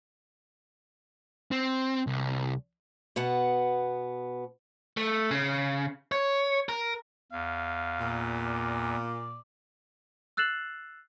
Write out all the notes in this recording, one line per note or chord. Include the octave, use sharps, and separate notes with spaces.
C4
C2
B2 B3 F#5
A3
C#3
C#5
A#4
E2 F5
A#2
D5
E6 F#6 A6 C7 E7 F#7